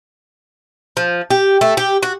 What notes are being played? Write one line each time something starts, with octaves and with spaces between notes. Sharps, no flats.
F3
G4
A3
G4
F#4